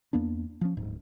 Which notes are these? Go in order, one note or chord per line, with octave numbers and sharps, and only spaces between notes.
E2 A#3 B3 D4
F3 C#4
D1 G#2